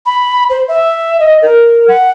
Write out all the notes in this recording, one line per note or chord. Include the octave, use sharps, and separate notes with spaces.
B5
C5
E5
D#5
A#4
F#5